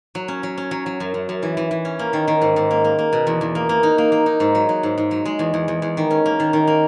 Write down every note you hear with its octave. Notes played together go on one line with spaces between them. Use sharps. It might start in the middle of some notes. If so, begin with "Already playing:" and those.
F#3
C#4
F#3
C#4
F#3
F#3
F#2
F#2
F#2
E3
E3
E3
C#4
A#3
D#3
D#3
G#2
G#2
A#3
A#3
A#3
B2
E2
E2
A#3
A#3
D#4
A#3
A#3
D#4
G#2
F#3
F#3
G#2
G#2
F#3
G#3
E2
E2
E2
E2
D#3
C#4
A#3
D#3
D#3
A#3